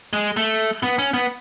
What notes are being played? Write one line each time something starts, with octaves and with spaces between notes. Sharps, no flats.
G#3
A3
B3
C#4
B3